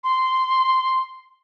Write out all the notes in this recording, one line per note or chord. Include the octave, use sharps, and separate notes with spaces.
C6